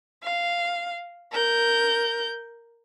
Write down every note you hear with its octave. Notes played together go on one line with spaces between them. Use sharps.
F5
A#4 G6